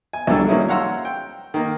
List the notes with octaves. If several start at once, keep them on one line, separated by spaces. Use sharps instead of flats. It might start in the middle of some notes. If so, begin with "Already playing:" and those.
G#5
C2 F#3 G3 D4 A4 E6
F#3 A#3 C#4 D#4 E4 G#4
C#5 F5 F#5 A#5 C6 E6
G5
D#3 A#3